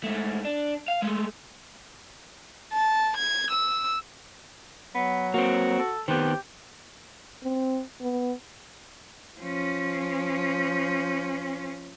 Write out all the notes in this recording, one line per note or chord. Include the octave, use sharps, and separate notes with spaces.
G#2 A3
D4
F5
G#3 A3
A5
G#6
E6
F#3 B3
A#3 C4 F#4
A4
D#3 B3 C4 G4
C4
B3
F3 C#4